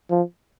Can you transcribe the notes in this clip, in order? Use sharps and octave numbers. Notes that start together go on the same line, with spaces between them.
F3